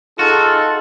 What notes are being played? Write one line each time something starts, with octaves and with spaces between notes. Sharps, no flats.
D#4 F4 F#4 G#4 A4